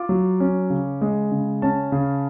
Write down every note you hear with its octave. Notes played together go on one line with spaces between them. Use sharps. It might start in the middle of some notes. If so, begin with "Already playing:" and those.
Already playing: F4 D6
F#3
C#4
C#3
G#3
C#3
C#4 A5
C#3